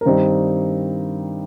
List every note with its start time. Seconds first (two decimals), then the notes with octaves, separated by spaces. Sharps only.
0.01 A#4
0.05 G2 D#3 G3 C4 D#4 C5